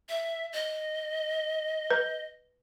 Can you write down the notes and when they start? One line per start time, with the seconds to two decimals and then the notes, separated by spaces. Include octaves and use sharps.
0.09 E5
0.53 D#5
1.91 B4